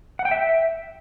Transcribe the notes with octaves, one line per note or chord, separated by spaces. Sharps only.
F#5
G5
E5